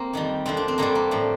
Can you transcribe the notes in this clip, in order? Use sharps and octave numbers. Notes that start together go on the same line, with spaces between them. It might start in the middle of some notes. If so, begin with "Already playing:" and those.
Already playing: A#3 C4
F2 D#3 G3
F2 D3 F3 C4
D4
C4
G2 D3 G3 A#3
A#3
A2 F3